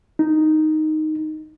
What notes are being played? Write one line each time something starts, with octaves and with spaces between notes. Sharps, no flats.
D#4